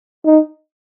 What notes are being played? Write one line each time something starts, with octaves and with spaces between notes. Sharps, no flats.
D#4